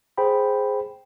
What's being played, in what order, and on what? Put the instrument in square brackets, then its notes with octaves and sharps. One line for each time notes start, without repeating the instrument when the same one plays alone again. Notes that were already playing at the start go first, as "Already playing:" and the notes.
[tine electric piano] G#4 C5 G5 B5